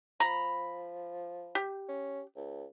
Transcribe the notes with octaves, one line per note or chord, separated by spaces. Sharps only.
F3 A#5 B5
G4
C#4
C#2